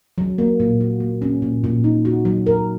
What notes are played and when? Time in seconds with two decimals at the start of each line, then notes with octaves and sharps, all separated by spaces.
0.18 F#3
0.38 A#3
0.60 A#2
0.81 F#4
1.00 A#3
1.22 C#4
1.42 A#2
1.64 A#2
1.84 D#4
2.05 F#4
2.25 F#3
2.46 A#4